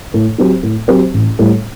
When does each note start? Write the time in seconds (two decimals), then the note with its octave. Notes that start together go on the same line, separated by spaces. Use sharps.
0.14 A2
0.38 F#3 C4 G4
0.63 A2
0.88 F#3 C4 G4
1.14 A1
1.39 A2 G3